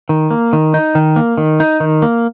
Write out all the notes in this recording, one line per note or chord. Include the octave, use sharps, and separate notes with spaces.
D#3
A#3
D#3
D#4
D#3
A#3
D#3
D#4
D#3
A#3